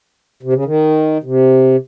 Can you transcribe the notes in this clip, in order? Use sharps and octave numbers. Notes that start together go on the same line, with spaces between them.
C3
C#3
D#3
C3